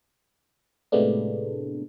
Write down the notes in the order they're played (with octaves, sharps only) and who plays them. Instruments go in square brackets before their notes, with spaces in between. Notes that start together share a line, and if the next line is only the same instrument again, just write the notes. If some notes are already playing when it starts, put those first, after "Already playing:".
[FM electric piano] A2 C3 G#3 A3 B3 D4